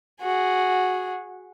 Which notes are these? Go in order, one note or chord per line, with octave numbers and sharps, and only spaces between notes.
F#4 G#4